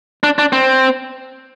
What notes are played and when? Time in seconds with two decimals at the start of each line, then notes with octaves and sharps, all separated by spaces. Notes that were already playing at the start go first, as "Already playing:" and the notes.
0.23 D4
0.39 D4
0.53 C4